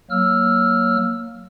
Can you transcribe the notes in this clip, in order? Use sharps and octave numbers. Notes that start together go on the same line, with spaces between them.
F#3 A#3 E6 F6